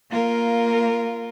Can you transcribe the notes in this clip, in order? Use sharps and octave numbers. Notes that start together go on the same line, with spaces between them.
A#3 F4 A#4